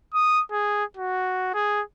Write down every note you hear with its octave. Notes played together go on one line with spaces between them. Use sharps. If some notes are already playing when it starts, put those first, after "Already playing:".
D#6
G#4
F#4
G#4